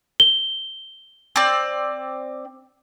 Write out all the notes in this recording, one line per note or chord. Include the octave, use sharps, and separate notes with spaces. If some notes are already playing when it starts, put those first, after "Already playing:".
G7
C4 D5